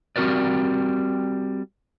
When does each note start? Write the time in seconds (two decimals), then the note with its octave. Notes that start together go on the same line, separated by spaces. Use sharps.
0.16 G3 C4 F#4 A#4 B4 D5